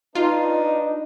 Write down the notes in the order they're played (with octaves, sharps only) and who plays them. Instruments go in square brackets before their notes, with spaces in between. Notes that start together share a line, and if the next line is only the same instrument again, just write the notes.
[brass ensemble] D4 B4 D#5 [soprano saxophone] D#4 [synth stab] F4